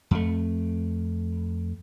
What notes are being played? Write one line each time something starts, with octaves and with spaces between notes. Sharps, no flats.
F2 A3